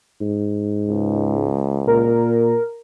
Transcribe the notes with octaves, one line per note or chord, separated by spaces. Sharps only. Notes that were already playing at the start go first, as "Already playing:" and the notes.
G#2
C#2
A#2 A#4